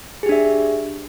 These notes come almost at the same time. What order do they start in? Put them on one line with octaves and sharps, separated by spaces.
G#4 G4 D4 E5